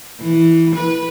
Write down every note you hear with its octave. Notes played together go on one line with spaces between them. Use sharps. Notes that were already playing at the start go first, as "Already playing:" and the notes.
E3
B4